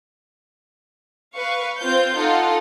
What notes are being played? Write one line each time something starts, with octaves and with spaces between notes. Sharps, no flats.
B4 F5 C#6
C4 F4 C5 F5 G6
D#4 F4 A4 F#5